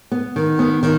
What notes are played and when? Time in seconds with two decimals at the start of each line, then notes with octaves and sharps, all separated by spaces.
0.12 B3
0.36 D#3
0.59 B3
0.83 D#3